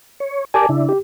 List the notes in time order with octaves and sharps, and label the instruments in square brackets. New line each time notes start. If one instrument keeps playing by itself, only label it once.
[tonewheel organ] C#5
[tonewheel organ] G4 A#4 D5 [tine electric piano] G#5 A5 D6
[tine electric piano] C#3 [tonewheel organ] D4 E4
[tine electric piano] G4